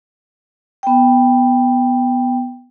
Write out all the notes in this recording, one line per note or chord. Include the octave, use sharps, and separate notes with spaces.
B3 G5